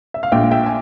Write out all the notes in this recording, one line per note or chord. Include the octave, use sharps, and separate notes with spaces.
E5
F5
A#1 A#2 G#3 E5 G5
E5 G5
G#5